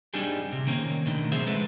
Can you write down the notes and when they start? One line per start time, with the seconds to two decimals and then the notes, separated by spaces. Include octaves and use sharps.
0.14 G3 C4 D4 D#4 G4 G#4
0.52 C3
0.67 D#3 A#3 C4 C#4
1.06 B2 D3 D#3 A3
1.32 C#2 F3 C4 G#4 C5 E5
1.47 G#3 A4 B4